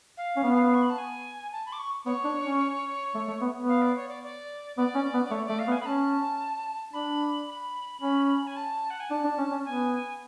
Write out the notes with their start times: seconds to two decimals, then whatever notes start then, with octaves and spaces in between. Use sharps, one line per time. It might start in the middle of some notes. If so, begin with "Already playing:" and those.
0.17 F5
0.36 C#4
0.43 B3
0.74 C#6
0.82 B5
0.90 A5
0.98 G#5
1.52 A5
1.66 B5
1.72 D6
1.79 C#6
2.06 B3 C#5
2.24 D4
2.43 C#4
3.15 A3
3.27 A3
3.41 B3
3.55 B3
3.68 F5
3.82 D5
3.95 C#5
4.08 D5
4.23 D5
4.76 B3 D5
4.95 C#4
5.13 B3
5.24 D5
5.31 A3 C#5
5.45 A3 D5
5.59 F5
5.67 B3
5.72 G#5
5.80 B5
5.85 C#4 A5
6.93 D4 B5
7.48 B5
8.01 C#4 B5
8.47 G#5
8.56 A5
8.90 F#5
9.00 G#5
9.10 D4 A5
9.24 D4
9.38 C#4
9.51 C#4
9.65 B3 G#5